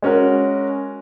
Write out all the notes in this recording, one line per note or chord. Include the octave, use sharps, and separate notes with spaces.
G#3 C#4 F#4 A#4